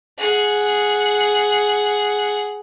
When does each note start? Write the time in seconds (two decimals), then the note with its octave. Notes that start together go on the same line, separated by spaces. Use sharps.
0.18 G#4 F#5